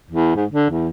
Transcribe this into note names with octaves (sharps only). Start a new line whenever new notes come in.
E2
G#2
D3
E2